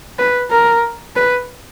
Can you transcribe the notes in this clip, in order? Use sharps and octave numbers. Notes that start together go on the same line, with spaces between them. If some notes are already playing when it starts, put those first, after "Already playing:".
B4
A#4
B4